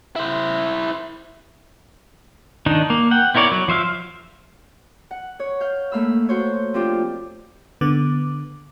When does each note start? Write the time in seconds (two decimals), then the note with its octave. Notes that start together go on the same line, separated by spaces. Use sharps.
0.16 E4 C5
2.66 D#3 D4 D#4
2.90 A#3
3.11 F#5 G5
3.35 B3 E4 A#4 C#5 D5
3.52 F#3
3.68 F3 C5 E5 F5
5.11 F#5
5.40 C#5
5.60 F5 G6
5.92 A3 A#3 F5 B5 E6
6.29 F#4 C5 C#5
6.74 F3 C4 D4 F4 G4
7.81 D3 B3 D6